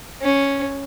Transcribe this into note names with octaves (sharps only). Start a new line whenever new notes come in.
C#4